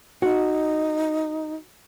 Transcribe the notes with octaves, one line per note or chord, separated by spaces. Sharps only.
D#4 F#4